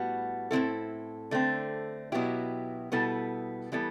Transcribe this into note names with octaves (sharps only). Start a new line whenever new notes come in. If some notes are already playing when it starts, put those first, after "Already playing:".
Already playing: A2 G3 B3 F#4
A2 F#3 C4 E4 A4
D3 A3 C4
B2 F#3 B3 E4 G4
B2 G3 B3 E4 A4
E3 G3 B3 E4 A4